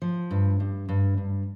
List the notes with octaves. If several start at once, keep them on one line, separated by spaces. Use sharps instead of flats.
F3
G2
G2
G2
G2